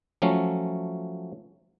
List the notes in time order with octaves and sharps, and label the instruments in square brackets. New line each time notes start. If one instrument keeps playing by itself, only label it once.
[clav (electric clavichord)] F3 F#3 A3 C#4